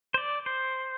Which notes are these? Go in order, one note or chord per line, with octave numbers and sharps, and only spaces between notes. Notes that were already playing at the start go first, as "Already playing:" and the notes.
C5
D5
C5